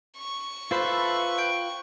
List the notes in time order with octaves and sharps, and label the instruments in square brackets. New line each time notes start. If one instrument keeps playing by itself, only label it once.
[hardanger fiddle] C#6
[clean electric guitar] F4 C5 [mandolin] A4 E5 [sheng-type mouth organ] B4 B5
[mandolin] G5